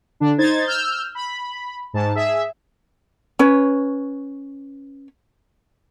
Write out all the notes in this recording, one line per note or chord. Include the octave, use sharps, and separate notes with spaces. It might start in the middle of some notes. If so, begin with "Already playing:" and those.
D3 D4
D#4 C5 G#6 A6
E6 F6 G6
B5
G#2 A5
G#4 E5
C#4 B4 C#5